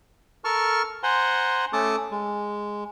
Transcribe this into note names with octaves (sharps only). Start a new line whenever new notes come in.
A4 A#4 A5 C#6 F6
C5 F#5 G#5 A#5 C6
A3 C#4 A4 A5 D6 D#6
G#3